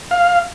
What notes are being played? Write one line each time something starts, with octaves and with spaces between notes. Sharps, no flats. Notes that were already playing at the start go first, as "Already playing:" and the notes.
F5